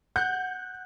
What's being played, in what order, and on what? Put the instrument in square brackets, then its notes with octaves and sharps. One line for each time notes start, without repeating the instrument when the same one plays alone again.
[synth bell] F#5 F#6 [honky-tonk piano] G6